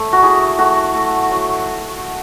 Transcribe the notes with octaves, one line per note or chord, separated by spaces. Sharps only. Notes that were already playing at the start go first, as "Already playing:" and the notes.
Already playing: A3
F#4
E4 G#4
A3 F#4
A3
F#3